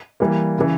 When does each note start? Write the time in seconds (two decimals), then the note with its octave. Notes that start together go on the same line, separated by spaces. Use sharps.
0.20 E3 G3 A#3
0.58 C#3 E3